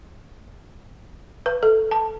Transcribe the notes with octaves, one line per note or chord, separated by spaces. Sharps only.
B4
A4
A5